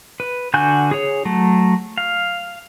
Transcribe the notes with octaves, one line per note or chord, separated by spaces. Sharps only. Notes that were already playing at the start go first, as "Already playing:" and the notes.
B4
D3 F#4 G#5 G6
G#4 C#5
F#3 A3
F5